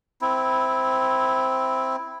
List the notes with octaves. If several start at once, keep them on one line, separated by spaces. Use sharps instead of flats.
C4 E4